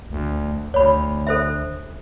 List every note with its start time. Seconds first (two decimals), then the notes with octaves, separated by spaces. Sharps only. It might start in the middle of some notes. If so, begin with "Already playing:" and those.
0.10 D2
0.74 D2 C#5 B5
1.27 A4 C5 E5